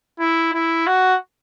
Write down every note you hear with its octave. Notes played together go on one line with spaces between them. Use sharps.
E4
E4
F#4